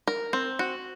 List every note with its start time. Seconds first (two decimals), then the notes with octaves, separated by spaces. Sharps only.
0.08 A#4
0.33 C4
0.59 F#4